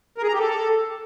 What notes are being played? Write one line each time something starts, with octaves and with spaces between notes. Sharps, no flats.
A#4
G#4
A#5
G4
A4